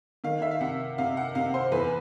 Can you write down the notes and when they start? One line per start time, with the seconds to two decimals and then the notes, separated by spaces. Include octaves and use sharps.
0.24 D#3 F5
0.42 E5
0.51 F5
0.60 C3 F#5
0.98 C3 F5
1.17 F#5
1.35 C3 F5
1.54 C5
1.72 E2 B4